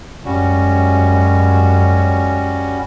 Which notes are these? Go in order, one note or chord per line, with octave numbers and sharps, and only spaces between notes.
F#2 G3 G#3 C#4 F#4